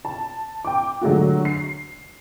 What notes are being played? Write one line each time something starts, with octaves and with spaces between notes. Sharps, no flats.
A5
G5 D6
D3 F#3 G#3 A3 F#4
C7